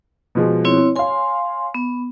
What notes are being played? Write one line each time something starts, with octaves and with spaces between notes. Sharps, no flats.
B2 F3 G#3
C4 E4 C#5
C#5 F5 G#5 C6
B3